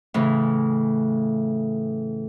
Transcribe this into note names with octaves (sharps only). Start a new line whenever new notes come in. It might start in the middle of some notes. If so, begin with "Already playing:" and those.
A2 C#3 E3